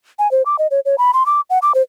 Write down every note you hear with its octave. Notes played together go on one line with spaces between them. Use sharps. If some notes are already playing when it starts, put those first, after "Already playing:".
G#5
C5
D6
D#5
C#5
C#5
B5
C6
D6
F#5
D6
C5